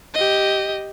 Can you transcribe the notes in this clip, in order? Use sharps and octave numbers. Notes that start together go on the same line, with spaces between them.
G4 D#5